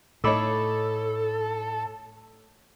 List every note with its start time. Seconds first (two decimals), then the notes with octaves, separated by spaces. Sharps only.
0.24 A2 A3 D#4 A4 C#5 B5 D6 E6